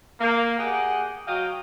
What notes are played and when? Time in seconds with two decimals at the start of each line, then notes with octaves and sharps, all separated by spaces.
0.20 A#3
0.58 G4 G#4 D#5 F#5
1.27 F#3 F#4 D#5 F5 G5